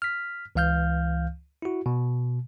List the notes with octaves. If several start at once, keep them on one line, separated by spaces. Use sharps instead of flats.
F6 B6
C#2 E3 F5 F6 G6
E4 F#4
B2